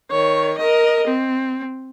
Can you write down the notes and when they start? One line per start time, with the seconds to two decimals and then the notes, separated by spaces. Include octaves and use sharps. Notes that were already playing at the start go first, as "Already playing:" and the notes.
0.11 D#3 C#5
0.58 A#4 D#5
1.08 C4